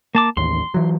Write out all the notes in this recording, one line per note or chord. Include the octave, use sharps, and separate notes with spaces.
A#3 A5 D6
A1 D#2 C6
E3 F#3